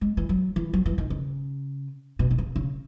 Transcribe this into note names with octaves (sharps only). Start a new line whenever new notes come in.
G#3
E3
F#3
E3
F#3
E3
D#3
C#3
B2
B2
C#3
C#3